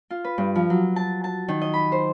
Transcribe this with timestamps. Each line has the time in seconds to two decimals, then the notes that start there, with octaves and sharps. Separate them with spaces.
0.10 F4
0.24 B4
0.38 G2
0.55 F3
0.70 F#3
0.96 A5
1.24 A5
1.48 D#3
1.61 D#5
1.74 B5
1.92 C5